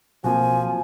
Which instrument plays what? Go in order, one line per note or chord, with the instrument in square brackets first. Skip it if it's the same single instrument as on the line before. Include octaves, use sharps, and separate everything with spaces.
[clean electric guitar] B1 [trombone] F3 [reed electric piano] A#3 C4 F#4 [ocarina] G#5